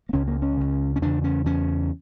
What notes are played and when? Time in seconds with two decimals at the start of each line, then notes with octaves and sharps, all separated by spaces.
0.09 A#3
0.13 C#2 C#3 C#4
0.27 A#3
0.42 C#4
0.57 C#2 C#3
0.96 C#4
1.02 E2 C#3 D4
1.24 C#4
1.46 E2 C#3 C#4